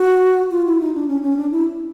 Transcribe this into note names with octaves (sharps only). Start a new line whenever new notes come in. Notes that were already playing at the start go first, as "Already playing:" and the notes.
Already playing: F#4
F4
E4
D#4
D4
C#4
C#4
D4
E4